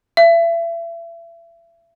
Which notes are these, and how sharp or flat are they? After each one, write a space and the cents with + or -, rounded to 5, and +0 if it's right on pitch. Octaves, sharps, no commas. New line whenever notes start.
E5 +35